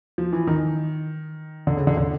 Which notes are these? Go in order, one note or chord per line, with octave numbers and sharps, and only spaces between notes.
F3
E3
D#3
D3
C#3
D3
D3